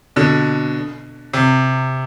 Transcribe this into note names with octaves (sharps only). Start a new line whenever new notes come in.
B2 D3
C3